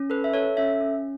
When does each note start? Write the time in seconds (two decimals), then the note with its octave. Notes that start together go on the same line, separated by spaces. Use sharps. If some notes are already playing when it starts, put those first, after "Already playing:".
Already playing: C#4
0.10 A4 B4
0.24 E5
0.33 A4 C#5
0.57 C#4 E5
0.81 C#4